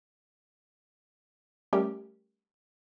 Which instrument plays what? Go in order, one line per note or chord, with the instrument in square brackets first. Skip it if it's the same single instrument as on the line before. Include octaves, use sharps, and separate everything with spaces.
[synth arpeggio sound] G3 A3 C#4 G4 A#4